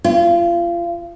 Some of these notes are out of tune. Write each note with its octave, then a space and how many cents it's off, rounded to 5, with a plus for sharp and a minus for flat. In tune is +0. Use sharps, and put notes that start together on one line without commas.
F4 -30